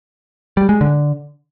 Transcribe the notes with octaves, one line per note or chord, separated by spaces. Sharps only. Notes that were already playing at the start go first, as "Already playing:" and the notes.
G3
G#3
D3